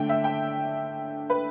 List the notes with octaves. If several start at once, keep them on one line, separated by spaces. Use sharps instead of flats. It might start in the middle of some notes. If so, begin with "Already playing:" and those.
Already playing: D3 A3 D4 G5
E5
G5
B4